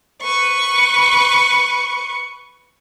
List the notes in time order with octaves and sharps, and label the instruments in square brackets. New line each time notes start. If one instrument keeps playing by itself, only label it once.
[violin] B4 C#6